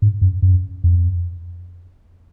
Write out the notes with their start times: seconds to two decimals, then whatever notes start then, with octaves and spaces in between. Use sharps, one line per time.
0.02 G#2
0.22 F#2
0.42 F#2
0.84 F2